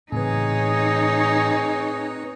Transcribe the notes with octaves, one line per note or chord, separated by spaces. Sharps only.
A2 C#3 E3 C4 D#4 G#4 B4 C#5